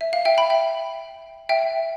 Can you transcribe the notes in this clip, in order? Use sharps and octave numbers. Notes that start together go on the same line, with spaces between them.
E5
F5
E5 G5
G5 B5
E5 G5
E5 G5